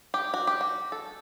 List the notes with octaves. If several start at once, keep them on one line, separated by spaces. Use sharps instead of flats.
G4
F#4
G4
F#4
A4